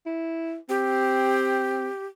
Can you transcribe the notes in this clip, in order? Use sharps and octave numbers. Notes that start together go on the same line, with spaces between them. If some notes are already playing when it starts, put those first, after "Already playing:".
E4
C4 G4